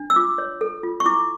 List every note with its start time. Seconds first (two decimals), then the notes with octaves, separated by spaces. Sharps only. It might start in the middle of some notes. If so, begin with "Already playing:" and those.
Already playing: D4
0.10 E6
0.16 F4 D6
0.38 C#5
0.61 A4
0.83 F4
1.00 C#6
1.06 E4 D6